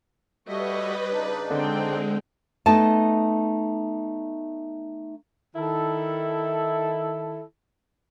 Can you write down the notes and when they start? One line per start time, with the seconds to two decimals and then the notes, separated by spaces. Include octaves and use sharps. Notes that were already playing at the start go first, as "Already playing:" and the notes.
0.48 G3 A3 F#4 B4 C#5 D#5 E5
1.12 C#3 D4 D#4
1.50 D3 G#3 C4 G5
2.66 A3 B3 D#4 A5
5.56 D#3 E4 A4